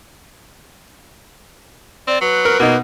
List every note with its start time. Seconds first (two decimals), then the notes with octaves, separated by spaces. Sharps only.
2.07 C4 D5
2.21 F#3 B4
2.45 A#4
2.60 B2 A#3 D#4